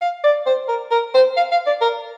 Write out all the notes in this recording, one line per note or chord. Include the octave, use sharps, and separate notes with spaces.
F5
D5
C5
A#4
A#4
C5
F5
F5
D5
A#4